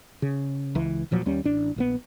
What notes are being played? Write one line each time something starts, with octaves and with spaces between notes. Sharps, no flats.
C#3
C#2 E3
E1 A#2 F3 F#3
D#2 G3 C#4
A1 D4
A#1 D#3 B3